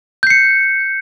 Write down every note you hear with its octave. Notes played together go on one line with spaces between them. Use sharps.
G6 C7 C#7